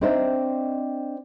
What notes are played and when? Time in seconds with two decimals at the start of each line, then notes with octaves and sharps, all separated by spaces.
0.01 C4 D4 D#4 C5 D#5 E5